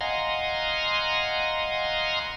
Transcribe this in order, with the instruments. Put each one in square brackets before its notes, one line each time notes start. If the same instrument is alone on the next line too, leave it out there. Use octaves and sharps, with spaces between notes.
[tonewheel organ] D#5 F5 F#5 G#5 A#5 C6